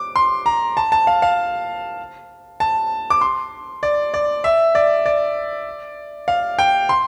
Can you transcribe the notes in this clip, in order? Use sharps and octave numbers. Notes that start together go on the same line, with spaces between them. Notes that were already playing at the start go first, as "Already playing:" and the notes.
Already playing: D6
C6
A#5
A5
A5
F5
F5
A5
D6
C6
D5
D5
E5
D5
D5
F5
G5
C6